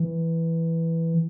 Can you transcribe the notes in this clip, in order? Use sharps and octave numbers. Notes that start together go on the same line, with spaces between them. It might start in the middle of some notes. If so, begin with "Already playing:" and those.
Already playing: E3